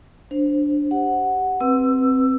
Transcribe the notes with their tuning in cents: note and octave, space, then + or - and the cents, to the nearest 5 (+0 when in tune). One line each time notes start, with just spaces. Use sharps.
D4 +0 C5 +0
G4 +0 F#5 +0
C4 +0 B4 +0 E6 +15